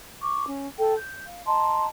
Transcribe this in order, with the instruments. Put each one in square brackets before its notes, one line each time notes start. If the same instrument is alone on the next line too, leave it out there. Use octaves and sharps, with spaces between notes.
[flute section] C#6 D6
C#4
A4 G5
G6
F5
D#5 A5 A#5 C6